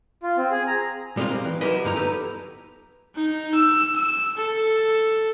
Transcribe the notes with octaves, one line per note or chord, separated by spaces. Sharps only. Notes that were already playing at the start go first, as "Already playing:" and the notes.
F4
C4
G#4
A#5
G3 G#3 A#3 C4 F4
A#3 C4
E3
F#3 E4 G4 A#4 B4 D#5
D2 G2 F3 A#3 D#4 A#5
D#4 G4 A4 B4
D#4
E6
E6
A4